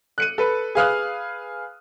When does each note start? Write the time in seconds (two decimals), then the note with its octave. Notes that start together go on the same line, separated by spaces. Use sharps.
0.18 F#6 C#7 D#7
0.38 A4 B4
0.75 G#4 B4 F5 D#6 F6 F#6